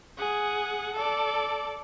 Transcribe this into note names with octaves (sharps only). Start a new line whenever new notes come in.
G#4 F#5
A4 D5